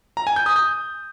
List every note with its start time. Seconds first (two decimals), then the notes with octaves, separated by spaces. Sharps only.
0.17 A#5
0.27 G#5
0.36 G6
0.46 D#6
0.56 G6